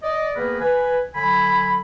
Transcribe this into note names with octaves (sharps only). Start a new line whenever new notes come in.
D5 D#5
D#3 A#3 B3 G#4 A#4 B4
B4 G#5
D3 F#3 G#5 B5